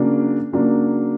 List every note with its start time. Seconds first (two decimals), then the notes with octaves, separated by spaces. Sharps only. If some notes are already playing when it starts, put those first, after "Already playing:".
Already playing: C#3 F#3 A#3 D4
0.52 C#3 F#3 A#3 D4